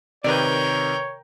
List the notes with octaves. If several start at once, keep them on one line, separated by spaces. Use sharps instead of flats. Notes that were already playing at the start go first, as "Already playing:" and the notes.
C3 D#3 A#4 B4 C#5 D5 G5